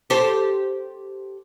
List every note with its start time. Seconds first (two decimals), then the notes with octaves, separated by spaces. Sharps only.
0.10 G4 A4 C5